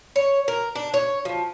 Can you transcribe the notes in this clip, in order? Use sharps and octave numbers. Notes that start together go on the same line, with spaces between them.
C#5
A#4
D4
C#5
F3